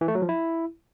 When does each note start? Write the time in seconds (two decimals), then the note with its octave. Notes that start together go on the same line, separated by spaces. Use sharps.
0.01 E3
0.08 A3
0.15 F#3
0.22 F3
0.29 E4